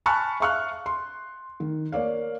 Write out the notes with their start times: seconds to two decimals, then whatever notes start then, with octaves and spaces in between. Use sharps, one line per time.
0.06 G#5 A5 B5 C#6 F6 F#6
0.40 E5 F5 C#6 F6 F#6
0.86 C6
1.60 D#3
1.92 A#3 C#5 D5 F5